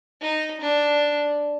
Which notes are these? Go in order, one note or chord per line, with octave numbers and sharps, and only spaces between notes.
D#4
D4